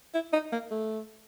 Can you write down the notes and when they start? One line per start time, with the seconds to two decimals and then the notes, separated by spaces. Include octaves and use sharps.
0.14 E4
0.33 D#4
0.52 A#3
0.71 A3